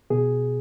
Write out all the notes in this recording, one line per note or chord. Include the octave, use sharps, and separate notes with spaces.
B2 G#4